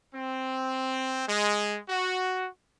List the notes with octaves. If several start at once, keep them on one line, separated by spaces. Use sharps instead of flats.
C4
G#3
F#4